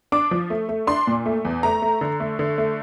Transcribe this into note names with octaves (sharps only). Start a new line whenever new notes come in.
D4 D6
F3
A3
A3
D4 C6
A#2
A3
E2
A3 A#5
A3
D3
A3
D3
A3